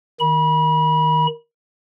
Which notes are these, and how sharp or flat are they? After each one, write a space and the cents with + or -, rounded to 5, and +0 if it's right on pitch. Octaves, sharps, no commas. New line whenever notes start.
D#3 +0 B5 -30